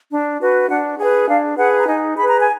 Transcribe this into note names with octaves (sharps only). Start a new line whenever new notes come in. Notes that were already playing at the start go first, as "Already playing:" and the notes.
D4
F#4 B4
D4 F#5
G#4 B4 G#5
D4 F5
G#4 B4 F#5
A#5
D#4 G#5
G#4 B4 B5
A#5
G#5